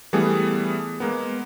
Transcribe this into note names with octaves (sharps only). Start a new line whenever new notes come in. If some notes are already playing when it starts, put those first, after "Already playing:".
E3 G3 A3 B3 G#4
G#3 A#3 B3